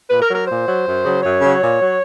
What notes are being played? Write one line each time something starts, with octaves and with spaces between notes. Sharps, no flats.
A#2 B4
A#4
F#3
A#4
A#2 C5
F#3
F#2
C#3 F#3
F#2 C#5
C#3 F#3
A#2
F#3